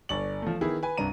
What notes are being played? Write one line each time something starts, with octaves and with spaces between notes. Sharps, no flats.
G1 D5 C#6 F#7
F3 A3
D#3 B3 E4 G#4
B4 G#5
C2 G2 D4 A#5 D#7